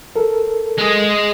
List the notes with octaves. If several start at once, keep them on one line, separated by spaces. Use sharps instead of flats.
A4 A#4
G#3 G#4